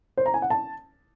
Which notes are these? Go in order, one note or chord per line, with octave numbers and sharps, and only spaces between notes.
C5
A#5
G#5
F#5
A5